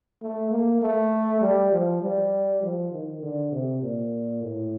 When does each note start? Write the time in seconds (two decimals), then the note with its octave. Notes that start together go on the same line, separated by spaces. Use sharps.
0.22 A3
0.51 A#3
0.82 A3
1.42 G3
1.72 F3
2.02 G3
2.63 F3
2.92 D#3
3.23 D3
3.52 C3
3.82 A#2
4.42 A2